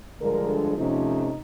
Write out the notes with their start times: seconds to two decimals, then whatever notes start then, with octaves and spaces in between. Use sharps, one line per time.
0.19 G2 D3 F3 G#3 A#4
0.48 A4
0.77 C3 F3 A3 C#4 D#4